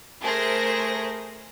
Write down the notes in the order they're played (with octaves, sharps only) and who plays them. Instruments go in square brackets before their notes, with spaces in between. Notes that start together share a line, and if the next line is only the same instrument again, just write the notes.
[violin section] A3 G#4 A#4 C5 A#6